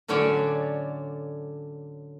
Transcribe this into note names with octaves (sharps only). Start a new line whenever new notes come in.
A2 D3 F#3 C#4 C#5 D5